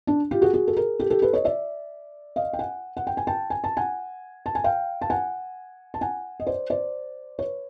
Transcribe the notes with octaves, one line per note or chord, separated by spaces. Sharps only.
D4
F4 G4
F#4 G#4
F#4 G#4
A4
G#4 A#4
G4 A4
G4 A4
A4 B4
C#5 D#5
D5 E5
D#5 F5
G5
F#5 G#5
F#5
G5
G#5
G5 A5
G#5
A5
F#5 G#5
A5
G#5
F5 G5
A5
F#5 G#5
A5
F#5 G#5
D#5
C5 D5
C5 D5
B4 C#5